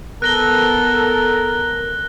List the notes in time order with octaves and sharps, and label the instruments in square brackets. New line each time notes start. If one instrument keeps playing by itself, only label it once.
[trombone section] B3 A4 [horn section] A#4 [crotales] F#6 A#6 G7